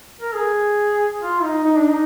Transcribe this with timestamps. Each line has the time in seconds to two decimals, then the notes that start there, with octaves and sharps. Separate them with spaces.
0.21 A#4
0.35 G#4
1.21 F4
1.43 D#4
1.64 D#4
1.78 D4
1.91 D#4